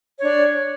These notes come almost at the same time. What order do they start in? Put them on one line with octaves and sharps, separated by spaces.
C#5 D4 D5